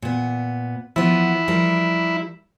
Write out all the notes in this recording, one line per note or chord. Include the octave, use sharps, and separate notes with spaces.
A#2 B3
F3 B3 E4
F3 G3 A#4